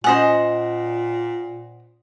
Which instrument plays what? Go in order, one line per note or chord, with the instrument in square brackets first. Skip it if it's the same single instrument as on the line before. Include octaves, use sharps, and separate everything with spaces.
[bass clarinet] A#2 [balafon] C#4 G#5 [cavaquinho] C5 D#5 F#5